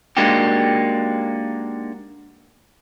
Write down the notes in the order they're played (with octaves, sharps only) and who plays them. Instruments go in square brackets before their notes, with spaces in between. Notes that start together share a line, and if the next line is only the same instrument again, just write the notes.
[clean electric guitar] G#3 A#3 D4 D#4 F#4 G4